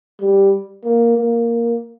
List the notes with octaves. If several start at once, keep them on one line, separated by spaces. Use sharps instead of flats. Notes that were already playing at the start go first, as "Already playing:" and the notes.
G3
A#3
A#3